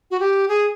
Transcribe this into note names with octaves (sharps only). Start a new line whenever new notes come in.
F#4
G4
G#4